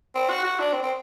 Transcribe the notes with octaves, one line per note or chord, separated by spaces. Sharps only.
C4
F#4
F#4
D4
C4
C4